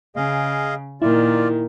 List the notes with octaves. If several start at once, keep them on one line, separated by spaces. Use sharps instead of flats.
C#3 G#4 D#5 F5
A#2 D#3 E4 F4 D5